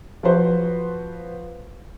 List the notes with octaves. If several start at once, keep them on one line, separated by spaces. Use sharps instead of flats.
F3 F#4 B4 C5